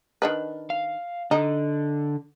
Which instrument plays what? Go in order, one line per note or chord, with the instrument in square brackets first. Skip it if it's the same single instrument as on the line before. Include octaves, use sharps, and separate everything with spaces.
[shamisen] D#3 D4 B4
[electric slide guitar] F5
[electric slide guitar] D3 [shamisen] D#4